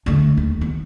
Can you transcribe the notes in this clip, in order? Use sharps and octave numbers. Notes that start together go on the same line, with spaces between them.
D3 A3
D#2
B3